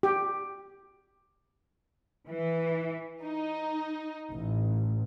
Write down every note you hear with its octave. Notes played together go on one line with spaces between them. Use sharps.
G4
E3
D#4
A1